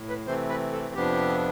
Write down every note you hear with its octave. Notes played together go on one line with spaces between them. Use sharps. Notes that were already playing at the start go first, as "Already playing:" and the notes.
Already playing: A2
B4
C3 E3 A3 C4 C5
B4
A4
F2 C3 F3 B3 D4 G4